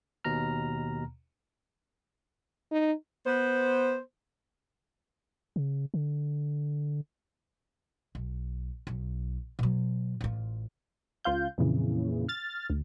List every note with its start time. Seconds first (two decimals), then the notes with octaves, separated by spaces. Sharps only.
0.24 D#2 B2 A#5 F6
2.71 D#4
3.26 B3 C5
5.56 C#3
5.94 D3
8.15 B1
8.87 B1
9.59 B2 F#3
10.21 A1 F4
11.24 C#2 F4 F5 G6
11.58 F2 A#2 C#3 E3
12.29 F6 A6
12.70 D2